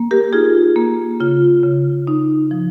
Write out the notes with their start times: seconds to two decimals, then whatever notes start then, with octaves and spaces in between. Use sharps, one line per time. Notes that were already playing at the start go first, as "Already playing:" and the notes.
Already playing: A#3
0.11 G4 A#4
0.33 D#4 F4 G#4
0.76 A#3
1.20 C#3 F4
1.64 C#3
2.07 D#4
2.51 F3